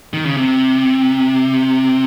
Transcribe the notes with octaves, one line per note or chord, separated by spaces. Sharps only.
D#3
C#3
C3